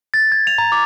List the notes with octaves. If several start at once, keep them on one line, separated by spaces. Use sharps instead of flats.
A6
G#6
F7
A#5
D6